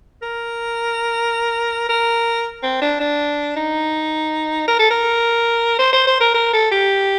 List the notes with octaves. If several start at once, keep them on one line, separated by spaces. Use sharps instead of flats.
A#4
A#4
C4
D4
D4
D#4
A#4
A4
A#4
C5
C5
C5
A#4
A#4
A4
G4